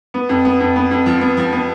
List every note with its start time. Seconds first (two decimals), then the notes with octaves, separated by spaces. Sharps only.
0.14 B3
0.29 F2
0.45 B3
0.60 F2
0.76 B3
0.91 F2
1.06 F3
1.21 B3
1.37 F3
1.52 B3